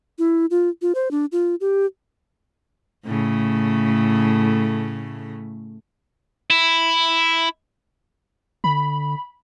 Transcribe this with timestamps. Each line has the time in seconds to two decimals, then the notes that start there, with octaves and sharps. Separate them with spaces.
0.19 E4
0.51 F4
0.82 F4
0.95 C5
1.11 D4
1.32 F4
1.61 G4
3.05 A2 C#3 A3
6.50 E4
8.64 D3 B5